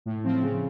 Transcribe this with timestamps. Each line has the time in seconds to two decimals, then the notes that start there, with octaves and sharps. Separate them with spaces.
0.06 A2
0.24 F3 C4
0.41 C#3